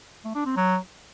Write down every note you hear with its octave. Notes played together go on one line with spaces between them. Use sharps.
A3
D4
C4
F#3